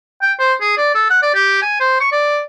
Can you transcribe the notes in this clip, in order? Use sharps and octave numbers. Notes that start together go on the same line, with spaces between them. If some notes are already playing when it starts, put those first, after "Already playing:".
G5
C5
G#4
D5
A4
F#5
D5
G4
G#5
C5
C#6
D5